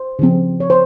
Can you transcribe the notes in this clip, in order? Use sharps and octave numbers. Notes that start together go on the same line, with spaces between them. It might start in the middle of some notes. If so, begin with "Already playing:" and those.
Already playing: C5
C#3 F3 C4
C#5
C5